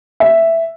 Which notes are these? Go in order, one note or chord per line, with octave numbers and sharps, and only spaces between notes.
E5